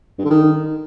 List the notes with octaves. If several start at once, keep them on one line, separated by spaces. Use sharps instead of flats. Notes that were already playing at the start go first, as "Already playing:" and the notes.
G2
D3
D#3